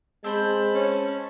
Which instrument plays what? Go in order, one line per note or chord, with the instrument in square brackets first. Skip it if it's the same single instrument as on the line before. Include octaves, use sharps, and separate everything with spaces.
[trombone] G#3 [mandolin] C4 C5 [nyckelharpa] A5 B5
[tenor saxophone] C#4